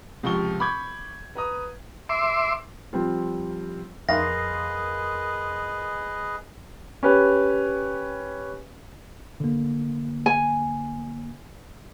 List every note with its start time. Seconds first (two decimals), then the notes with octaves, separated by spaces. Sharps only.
0.23 C#2 C3 F3 G4 C#6 G7
0.60 B5 C#6 D6 G6 G#6
1.35 B4 A#5 D#6
2.09 E5 C6 D6
2.93 F3 G3 C4 F4
4.09 F2 G#4 A#4 B4 D#5 F5 C6 A#6
7.03 C#4 G4 B4
9.40 D3 A#3
10.26 G#5